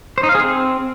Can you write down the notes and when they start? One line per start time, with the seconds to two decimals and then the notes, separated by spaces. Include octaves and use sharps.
0.18 C5
0.23 D#4
0.29 F5
0.35 G#4
0.41 C4